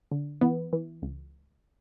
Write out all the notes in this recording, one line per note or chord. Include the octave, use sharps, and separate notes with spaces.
D3
E3 B3
E3
C#2